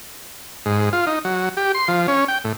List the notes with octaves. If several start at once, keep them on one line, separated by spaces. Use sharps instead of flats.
G#2
F4
D#4
F#3
G4
C6
F3
C#4
G5
A2